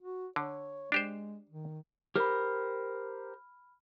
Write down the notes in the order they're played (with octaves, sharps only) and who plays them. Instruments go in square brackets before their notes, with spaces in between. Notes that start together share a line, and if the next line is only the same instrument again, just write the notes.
[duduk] F#4
[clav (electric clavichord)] D3 [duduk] C#5
[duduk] G#3 [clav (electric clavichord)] D4 G4 C5
[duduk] D#3
[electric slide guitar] G4 A#4 C5 [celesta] B5 F6